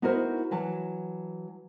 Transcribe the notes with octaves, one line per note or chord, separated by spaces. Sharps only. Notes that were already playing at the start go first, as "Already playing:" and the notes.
B3 D#4 E4 F#4 A#4 C5
E3 F#3 A5